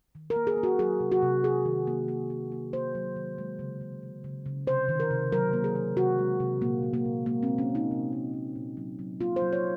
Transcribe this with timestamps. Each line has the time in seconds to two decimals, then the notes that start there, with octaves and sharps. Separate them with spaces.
0.15 D#3
0.30 A#4
0.36 A#3
0.47 G#4
0.57 A#3
0.63 F#4
0.79 F#3 G#4
1.00 C3
1.12 F#4
1.22 C3
1.44 F#3 G#4
1.65 D#3
1.87 A#3
2.08 A#3
2.30 A#3
2.52 A#3
2.73 A#3 C5
2.95 F#3
3.16 D#3
3.38 G#3
3.59 C#3
3.81 C#3
4.03 C#3
4.24 C#3
4.46 C#3
4.67 C3 C5
4.89 D#3
5.00 A#4
5.11 C3
5.32 F#3 A#4
5.53 A#3
5.64 G#4
5.75 A#3
5.97 C3 F#4
6.18 G#3
6.40 C3
6.61 A#2 A#3
6.83 A#2
6.94 A#3
7.05 A#2
7.26 G#3 A#3
7.43 C4
7.47 G#3
7.58 C#4
7.69 G#3
7.75 D#4
7.91 C3
8.13 A#3
8.34 A#3
8.56 A#2
8.77 F#3
8.99 F#3
9.20 A#3 F4
9.36 C5
9.42 F#3
9.53 C#5